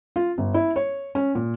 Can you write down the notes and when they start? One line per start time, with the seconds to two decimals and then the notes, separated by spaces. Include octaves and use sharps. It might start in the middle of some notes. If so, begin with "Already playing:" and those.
0.16 F4
0.38 G1
0.54 E4
0.76 C#5
1.15 C#4
1.35 A#2